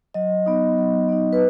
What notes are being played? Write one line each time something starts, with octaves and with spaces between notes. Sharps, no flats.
F#3 D#5
B3 D#4
F#3
B3 D#4
B4